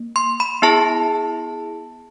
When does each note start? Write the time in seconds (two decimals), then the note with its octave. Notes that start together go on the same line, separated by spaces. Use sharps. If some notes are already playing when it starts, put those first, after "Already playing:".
Already playing: A#3
0.16 C6
0.40 B5
0.62 B3 E4 G#4 A5